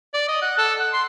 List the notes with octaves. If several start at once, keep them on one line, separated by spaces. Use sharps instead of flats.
D5
D#5
F#5
A4
F#5
C6